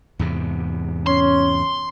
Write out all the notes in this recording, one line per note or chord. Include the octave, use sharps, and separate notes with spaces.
E2 G#2 C3
C#4 C6